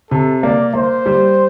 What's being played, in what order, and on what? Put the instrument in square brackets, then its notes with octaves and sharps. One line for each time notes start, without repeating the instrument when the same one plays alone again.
[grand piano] C3 [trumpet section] A4
[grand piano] A#3 [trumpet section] D5
[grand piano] A#3 [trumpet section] C5
[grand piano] G3